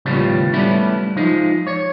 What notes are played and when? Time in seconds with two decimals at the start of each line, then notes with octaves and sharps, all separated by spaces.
0.06 D#2 A2 C#3 F3 G3 B3
0.53 G3 A3 B3 C#4 E4
1.16 F3 G#3 D#4
1.67 C#5